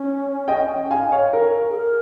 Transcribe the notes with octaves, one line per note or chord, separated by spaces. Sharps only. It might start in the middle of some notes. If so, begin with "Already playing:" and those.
Already playing: C#4
D#5 G5
F5 G#5
C#5 F5
A#4
G#4
A#4